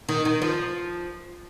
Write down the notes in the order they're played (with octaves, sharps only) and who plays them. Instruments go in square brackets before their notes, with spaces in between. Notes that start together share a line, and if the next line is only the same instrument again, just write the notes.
[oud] D#3
D#3
F3